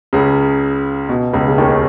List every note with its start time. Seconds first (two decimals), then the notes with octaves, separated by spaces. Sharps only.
0.13 C#2 C#3
1.09 B2
1.33 C#2 C#3
1.48 C#3
1.58 D#2 D#3